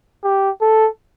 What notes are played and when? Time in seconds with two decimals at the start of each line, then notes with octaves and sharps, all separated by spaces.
0.24 G4
0.62 A4